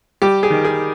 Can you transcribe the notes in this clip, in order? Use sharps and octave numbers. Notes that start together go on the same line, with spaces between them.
G3 G4
G#4
D#3
G#4